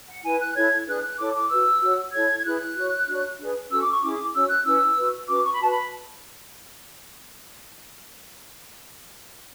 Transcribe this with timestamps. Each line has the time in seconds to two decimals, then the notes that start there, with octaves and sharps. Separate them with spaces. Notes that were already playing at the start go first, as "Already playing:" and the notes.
0.08 F#5
0.24 E4 B4 G#5
0.40 F#6
0.55 E4 A4 C#5 G#6
0.87 D4 G#4 B4 F#6
1.03 F#6
1.18 E4 A4 C#5 D6
1.34 D6
1.50 F#4 B4 E6
1.81 F#4 C#5
2.12 E4 A4 C#5 G#6
2.39 G#6
2.44 E4 G#4 B4 F#6
2.76 F#4 C#5
3.07 D4 F#4 C#5
3.38 D4 G#4 B4
3.70 C#4 F#4 A4 E6
3.81 D6
3.91 C#6
4.02 C#4 E4 G#4 D6
4.33 C#4 F#4 C#5 E6
4.48 F#6
4.64 C#4 E4 B4 E6
4.96 F#4 B4
5.27 C#4 F#4 B4 D6
5.43 C#6
5.52 B5
5.59 F#4 B4 A5
5.70 B5